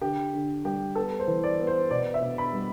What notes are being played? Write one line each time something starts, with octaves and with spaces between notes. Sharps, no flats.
D3 G4
D3
G3 G4
B3 A4
C5
E3
D5
B3
C5
B2 D5
E5
B2
B5
G3